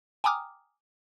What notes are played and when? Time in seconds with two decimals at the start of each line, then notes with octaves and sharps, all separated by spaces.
0.24 G5 G#5 A#5 D6 D#6 F6